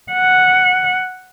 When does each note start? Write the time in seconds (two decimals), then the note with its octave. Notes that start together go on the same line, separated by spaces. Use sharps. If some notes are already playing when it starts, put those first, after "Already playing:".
0.12 F#5